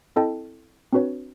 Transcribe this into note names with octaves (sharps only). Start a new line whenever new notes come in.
C4 E4 A4 D#5 G5 A5
C4 D4 F#4 B4 C#5